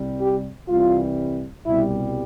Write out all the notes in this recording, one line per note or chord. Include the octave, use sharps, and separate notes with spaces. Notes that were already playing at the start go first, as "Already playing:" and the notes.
Already playing: C2 C3 G3
G4
C2 C3 E3 G3 F4
C2 B2 G3 E4